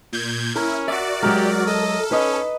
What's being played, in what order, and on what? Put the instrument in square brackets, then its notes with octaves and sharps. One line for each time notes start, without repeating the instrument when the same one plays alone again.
[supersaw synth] A#2 G6 G#6
[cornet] C#4 [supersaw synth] E4 [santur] A#4
[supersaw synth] F#4 D5 [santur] E5
[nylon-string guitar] F#3 G#3 [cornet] G4 [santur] A#4
[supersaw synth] A4 [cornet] D#5
[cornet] C#4 [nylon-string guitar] D#4 [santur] B4 D#5